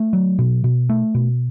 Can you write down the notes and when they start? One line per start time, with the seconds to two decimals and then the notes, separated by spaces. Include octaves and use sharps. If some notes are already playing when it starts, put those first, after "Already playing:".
Already playing: A3
0.13 F#3
0.39 B2
0.64 B2
0.89 A3
1.15 B2